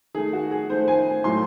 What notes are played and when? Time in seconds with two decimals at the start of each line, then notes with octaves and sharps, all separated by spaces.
0.15 D#3 A3 G#4
0.33 F#4
0.51 G#4
0.70 D#3 A3 C5
0.88 G#5
1.24 A2 F#3 A3 C6